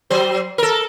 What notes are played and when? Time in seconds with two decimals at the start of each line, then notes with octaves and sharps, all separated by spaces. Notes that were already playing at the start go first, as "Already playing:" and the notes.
0.10 F#3 C5
0.58 A4 A#4